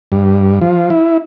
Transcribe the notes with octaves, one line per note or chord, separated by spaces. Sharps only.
G2
F3
E4